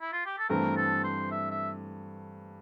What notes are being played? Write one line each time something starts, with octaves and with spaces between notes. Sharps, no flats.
E4
F4
G4
A4
G2 E3 A3 C4 A#4
A4
C5
E5
E5